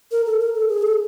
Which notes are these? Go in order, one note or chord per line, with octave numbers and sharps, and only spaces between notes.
A#4
A4
A#4
A4
G#4
A4